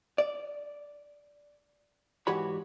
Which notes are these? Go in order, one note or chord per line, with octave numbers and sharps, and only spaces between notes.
D5
G#2 E3 F#4 G4 C#5 B5